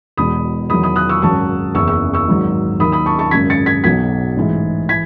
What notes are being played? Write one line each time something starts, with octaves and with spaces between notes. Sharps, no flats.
E1 E2 B2 B5 D#6
E2 D#3 F#3 B5 D#6
B5 D#6
D#6 F#6
C#6 E6
G#1 F#2 C#3 F#3 A5 C#6
F#1 E2 C#3 E3 C#6 E6
C#6 E6
C#6 E6
G#1 G#2 F#3
D#2 D#3 F#3 B5 D#6
B5 D#6
A5 C#6
A5 C#6
G#1 F#2 C#3 G#6 B6
A6 C#7
G#6 B6
B1 B2 F#3 G#6 B6
A1 G#2 E3
E3 G#6 B6